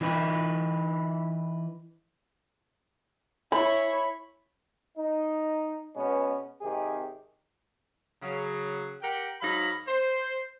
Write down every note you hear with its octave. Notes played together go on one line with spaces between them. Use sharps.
E3 D#4 B4
E4 C#5 B5
D#4
B2 G#3 B3 C#4
G#1 C3 D#3 G4 G#4
C#3 F#3
G4 A#4 F#5 G5
G#2 F#3 D#4 F5 B5
C5